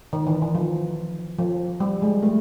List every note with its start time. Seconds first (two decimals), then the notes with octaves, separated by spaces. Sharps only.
0.13 D#3
0.27 E3
0.42 E3
0.55 F3
1.38 F3
1.80 G3
2.02 G#3
2.23 A3